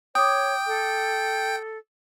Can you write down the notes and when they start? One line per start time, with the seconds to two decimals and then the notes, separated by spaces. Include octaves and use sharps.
0.15 C#5 G5 D6 D#6
0.67 A4